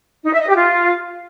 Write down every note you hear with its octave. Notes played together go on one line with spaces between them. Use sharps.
D#4
E5
D#5
G4
F4